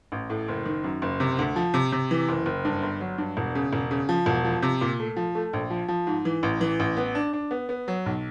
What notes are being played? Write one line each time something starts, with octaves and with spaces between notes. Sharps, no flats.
A1
A2
F#1
D#3
F#2
F#1
C3
D2
F3
C3
C3
E3
F#1
F#1
G2
G1
F#3
G2
E1
C#3
E1
C#3
F3
E1
F3
C3
A#2
A3
F3
A3
A#1
F3
F3
G#2
E3
A1
E3
A1
B3
D4
D4
B3
B3
F#3
B1